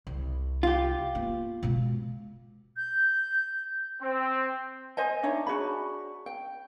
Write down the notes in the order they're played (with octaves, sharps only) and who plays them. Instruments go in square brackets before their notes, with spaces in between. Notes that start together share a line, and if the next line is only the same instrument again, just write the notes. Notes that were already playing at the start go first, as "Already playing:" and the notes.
[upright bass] C2
[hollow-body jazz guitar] F4 G4
[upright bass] A#3 B3
B2 G#3
[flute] G6
[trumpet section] C4
[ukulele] C5 D#5 G#5
D4 D#4 C#5 E5
D4 F#4 G#4 B5
G5